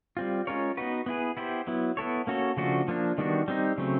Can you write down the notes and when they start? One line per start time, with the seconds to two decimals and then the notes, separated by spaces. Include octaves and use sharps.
0.17 G3 C4 F4
0.47 G#3 C#4 F4 A#4 C#5
0.77 B3 D#4 F#4 B4
1.06 B3 E4 G#4 B4
1.37 B3 E4 G4 C5
1.67 F#3 B3 E4
1.97 B3 E4 A4 C#5
2.27 A#3 C#4 F#4 A4 C#5
2.57 C#3 F3 A3 D4 F#4
2.88 F3 A#3 D4
3.18 D#3 G3 B3 D4 F#4
3.48 G3 C4 D#4
3.78 C#3 F#3 A3 C4